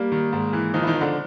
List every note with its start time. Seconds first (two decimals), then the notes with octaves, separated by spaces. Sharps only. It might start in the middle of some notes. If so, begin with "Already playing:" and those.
Already playing: G3 A#3
0.12 D#3
0.33 G#2
0.53 E3
0.74 D#3 F3 D#4
0.83 E4
0.87 D#3 D#4
0.95 F3
1.01 D3 D4